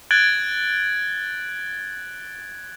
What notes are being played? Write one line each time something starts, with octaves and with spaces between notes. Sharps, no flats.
F#6 G#6 A6 D7 F#7 G7